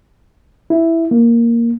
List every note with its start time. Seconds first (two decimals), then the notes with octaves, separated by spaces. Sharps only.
0.70 E4
1.11 A#3